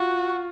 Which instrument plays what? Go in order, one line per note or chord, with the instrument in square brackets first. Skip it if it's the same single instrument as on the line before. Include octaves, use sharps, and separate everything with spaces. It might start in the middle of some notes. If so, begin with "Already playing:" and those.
Already playing: [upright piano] F4 [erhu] F#4